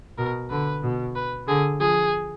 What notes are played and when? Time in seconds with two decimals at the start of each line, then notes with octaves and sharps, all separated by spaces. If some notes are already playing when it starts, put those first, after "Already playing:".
0.18 B2 A#4
0.50 D3 B4
0.82 B2
1.15 B4
1.47 D3 G#4
1.80 F3 G#4